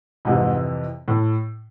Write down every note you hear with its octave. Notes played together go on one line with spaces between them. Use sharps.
F2 G#2 C3 E3
A2